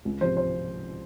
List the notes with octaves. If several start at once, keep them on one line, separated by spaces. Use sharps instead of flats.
C#2
C3 F3 C5
C5